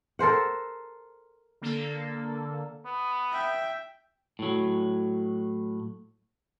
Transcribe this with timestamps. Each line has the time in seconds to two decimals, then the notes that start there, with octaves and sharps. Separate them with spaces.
0.19 A4 A#4 C5 F#5
1.62 D3 A#3 A4
2.85 B3
3.32 E5 G5
4.39 A2 F#3